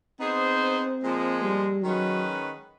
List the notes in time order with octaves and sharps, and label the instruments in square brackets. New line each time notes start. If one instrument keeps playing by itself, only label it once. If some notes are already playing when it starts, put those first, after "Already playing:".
[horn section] B3 D#4 G#4 C5 [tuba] C4
[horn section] A#2 F3 G#3
[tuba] G3
[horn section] D#3 G#3 C#4 F#4 B4 [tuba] F#3